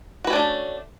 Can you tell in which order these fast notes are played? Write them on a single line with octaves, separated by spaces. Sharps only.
F#4 B4 C#4 D4 A3